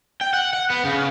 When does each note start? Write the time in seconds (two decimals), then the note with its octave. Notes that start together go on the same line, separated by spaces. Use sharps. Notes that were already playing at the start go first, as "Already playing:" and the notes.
0.21 G5
0.33 F#5
0.53 F#5
0.70 B3
0.85 C#3